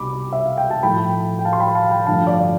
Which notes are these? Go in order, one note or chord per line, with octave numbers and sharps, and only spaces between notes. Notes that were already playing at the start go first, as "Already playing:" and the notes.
Already playing: C2 B2 G3 B5 D6
E5
F5
G5
A5
A2 F3 A3 G5 B5
G5
F5 A5
C6
G5 B5
F5 A5
G5 B5
G2 D3 F3 A3 F5 A5
D5 F5